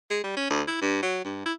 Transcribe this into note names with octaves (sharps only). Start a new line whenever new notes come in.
G#3
G3
C#4
D2
E4
G2
F#3
G2
E4